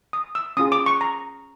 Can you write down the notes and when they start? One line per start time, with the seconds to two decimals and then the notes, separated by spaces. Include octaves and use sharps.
0.13 D#6
0.35 E6
0.57 C#4 F4 G#4 D#6
0.72 D6
0.86 C#6
1.01 A#5